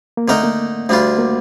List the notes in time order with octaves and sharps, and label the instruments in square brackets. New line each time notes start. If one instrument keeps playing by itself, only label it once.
[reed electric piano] A#3
[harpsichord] D3 A3 D#4 A#4 D#5 [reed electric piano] C4
[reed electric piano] A#3
[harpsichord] D2 D3 G3 D4 F4
[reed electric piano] A#3